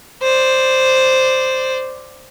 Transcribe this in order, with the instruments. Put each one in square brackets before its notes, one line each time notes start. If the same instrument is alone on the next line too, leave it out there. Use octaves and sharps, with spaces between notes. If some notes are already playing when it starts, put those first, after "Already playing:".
[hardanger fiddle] C5 D5